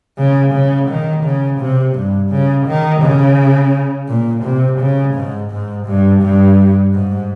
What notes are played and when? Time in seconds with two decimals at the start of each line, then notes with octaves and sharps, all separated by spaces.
0.18 C#3
0.53 C#3
0.89 D#3
1.24 C#3
1.60 C3
1.95 G2
2.30 C#3
2.67 D#3
3.01 C#3
4.08 A#2
4.44 C3
4.80 C#3
5.14 G#2
5.51 G#2
5.87 G2
6.22 G2
6.93 G#2